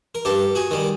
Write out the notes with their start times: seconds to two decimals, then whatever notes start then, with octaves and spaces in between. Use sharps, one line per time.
0.15 A#4
0.25 G2 G4 A4
0.55 F#4 G#4
0.71 D#3 G3